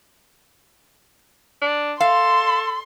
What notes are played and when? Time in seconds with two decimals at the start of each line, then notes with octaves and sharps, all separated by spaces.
1.62 D4
2.00 A4 F5 C6